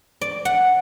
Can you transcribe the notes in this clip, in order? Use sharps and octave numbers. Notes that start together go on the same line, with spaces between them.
D5
F#5